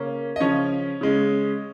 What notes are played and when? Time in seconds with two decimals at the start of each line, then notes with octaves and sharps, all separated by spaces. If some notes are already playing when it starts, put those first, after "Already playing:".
Already playing: C#3 A#3 C#4
0.36 D#5
0.40 C#3 F3 C#4 C#5
1.01 C#3 G#3 C#4